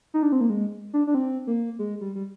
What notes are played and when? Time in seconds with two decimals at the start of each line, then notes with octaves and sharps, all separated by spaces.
0.14 D#4
0.23 D4
0.32 C4
0.41 A#3
0.50 G#3
0.94 D4
1.07 D4
1.15 C4
1.47 A#3
1.79 G#3
2.01 G3
2.15 G3